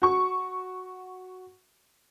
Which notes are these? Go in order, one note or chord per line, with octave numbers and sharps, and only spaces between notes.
F#4 C#6